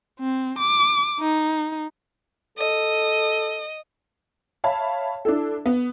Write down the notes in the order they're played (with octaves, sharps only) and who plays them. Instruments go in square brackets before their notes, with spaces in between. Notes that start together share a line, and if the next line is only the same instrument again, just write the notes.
[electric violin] C4
D6
D#4
[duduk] A4 [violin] D#5
[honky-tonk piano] C#5 E5 F5 A5 B5
D4 E4 A4
B3